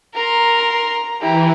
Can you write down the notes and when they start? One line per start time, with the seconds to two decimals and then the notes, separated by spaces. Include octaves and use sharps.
0.15 A#4 A#5 C6
0.59 A#5
1.21 E3 E4 G4 A#5